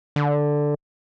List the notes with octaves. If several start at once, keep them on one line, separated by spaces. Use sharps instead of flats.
D3